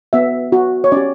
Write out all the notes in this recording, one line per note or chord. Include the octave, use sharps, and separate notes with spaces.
B3 F#4 E5
B3 F#4
C#5
C#4 G4 D5